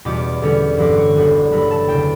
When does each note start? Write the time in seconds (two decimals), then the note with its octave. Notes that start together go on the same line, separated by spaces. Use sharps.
0.05 E2 B2 G3 C#4 D6
0.42 E2 D3 G3 C#4
0.77 A1 G2 F#3 B3 D6
0.97 C#6
1.16 F#1 E2 D3 G3 B3
1.51 G1 G2 F#3 A3 B5
1.71 A5
1.88 F#1 E2 C#3 G5